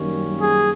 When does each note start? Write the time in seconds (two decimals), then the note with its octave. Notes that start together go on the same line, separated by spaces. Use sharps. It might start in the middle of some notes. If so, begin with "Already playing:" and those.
Already playing: F#2 D#3 G3 A#3 C#4
0.39 G#4